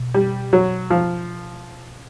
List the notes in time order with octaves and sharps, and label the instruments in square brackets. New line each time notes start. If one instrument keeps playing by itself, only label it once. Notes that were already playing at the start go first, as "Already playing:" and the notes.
Already playing: [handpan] B2
[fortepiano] G3
F#3
F3